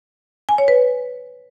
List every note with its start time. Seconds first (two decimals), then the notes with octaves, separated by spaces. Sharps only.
0.49 G#5
0.58 C#5
0.68 B4